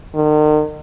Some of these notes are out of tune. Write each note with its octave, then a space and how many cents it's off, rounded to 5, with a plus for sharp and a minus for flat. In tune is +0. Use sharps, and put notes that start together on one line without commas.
D#3 -40